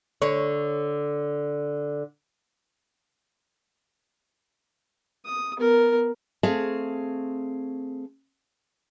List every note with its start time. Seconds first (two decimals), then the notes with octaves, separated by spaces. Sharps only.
0.22 D3 C#5
5.25 D#6
5.58 B3 A#4
6.43 A3 C4 G#4 F5